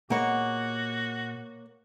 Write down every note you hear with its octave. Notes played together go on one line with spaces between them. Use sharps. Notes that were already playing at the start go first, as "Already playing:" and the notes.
A#2 A#3 F#4 G#4 C#5 D#5 F#5 B5